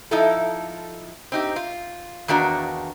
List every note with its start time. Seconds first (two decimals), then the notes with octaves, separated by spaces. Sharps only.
0.11 F3 D#4 E4 A4
1.32 C4 D#4 G4
1.56 F4
2.28 E2 D#3 A#3 D4 F#4